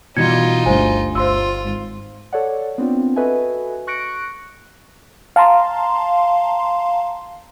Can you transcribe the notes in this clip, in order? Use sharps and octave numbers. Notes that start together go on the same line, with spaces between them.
B2 E3 G3 D#4 F4 G#6 C#7
G1 D2 G2 C5 G#5
G1 F4 C5 C6 E6
G#1
A4 C#5 D5 F#5
B3 C4 D4 F4
F#4 A4 B4 D#5 E5 G#5
C#6 F#6 A#6 C#7 D7
F5 A5 A#5 C6